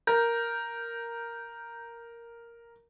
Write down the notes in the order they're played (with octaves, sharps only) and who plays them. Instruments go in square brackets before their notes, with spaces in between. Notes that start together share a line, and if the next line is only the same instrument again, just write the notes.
[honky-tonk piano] A#4 [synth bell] G6